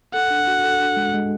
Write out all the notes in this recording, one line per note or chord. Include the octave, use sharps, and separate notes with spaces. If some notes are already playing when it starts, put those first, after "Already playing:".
A4 F#5
D4
F#4
A4
D4
G#3
G#3